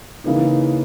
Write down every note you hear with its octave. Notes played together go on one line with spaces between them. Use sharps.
C#3 E3 A#3 D#4